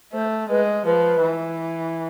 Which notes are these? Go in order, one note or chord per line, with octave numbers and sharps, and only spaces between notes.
A3 C5
G#3 B4
F3 B4
E3